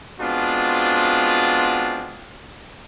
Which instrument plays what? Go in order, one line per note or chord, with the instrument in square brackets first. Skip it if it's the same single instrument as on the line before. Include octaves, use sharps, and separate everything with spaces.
[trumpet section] G#3 B3 C4 D4 F4 F#4